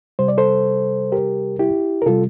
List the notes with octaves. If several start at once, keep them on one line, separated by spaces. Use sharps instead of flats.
C3 G3 C5
D5
A4 C5
G4 A#4
E4 G4
A#4
C3 G3 F4 A4